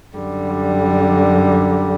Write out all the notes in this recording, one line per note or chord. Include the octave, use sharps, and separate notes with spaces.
F#2 D3 G3